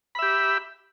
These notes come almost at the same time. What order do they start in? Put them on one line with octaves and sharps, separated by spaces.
B5 E5 G4